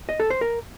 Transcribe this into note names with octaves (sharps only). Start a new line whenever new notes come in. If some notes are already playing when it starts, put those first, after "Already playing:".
D#5
A4
C5
A#4